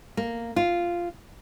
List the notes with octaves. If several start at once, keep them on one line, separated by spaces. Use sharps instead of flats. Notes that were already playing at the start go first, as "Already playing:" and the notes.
A#3
F4